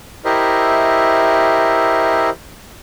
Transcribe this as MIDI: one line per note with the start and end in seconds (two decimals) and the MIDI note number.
0.25 2.30 64
0.25 2.30 67
0.25 2.30 70
0.25 2.30 72
0.25 2.30 75
0.25 2.30 76